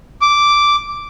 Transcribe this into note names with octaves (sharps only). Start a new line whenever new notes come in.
D6